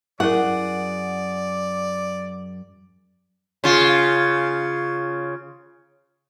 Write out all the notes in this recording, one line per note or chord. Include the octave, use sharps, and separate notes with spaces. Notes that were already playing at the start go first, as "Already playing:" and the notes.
F#2 E4 G#4 A#4 D5 F#5
C#3 F4